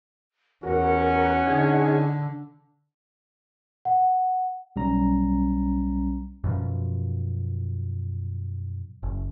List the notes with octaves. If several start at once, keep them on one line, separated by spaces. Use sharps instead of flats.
E2 C#4 F#4 A#4 F#5
D3 D#4 G#4 G#5
F#5
B1 G3 C#4 A#5
F#2 B2 F3
F#1